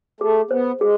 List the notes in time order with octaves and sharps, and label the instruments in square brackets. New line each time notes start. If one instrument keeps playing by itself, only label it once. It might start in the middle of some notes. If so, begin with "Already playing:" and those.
[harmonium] A3 [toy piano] G#4
[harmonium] B3 [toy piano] C5
[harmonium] G#3 [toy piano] G#4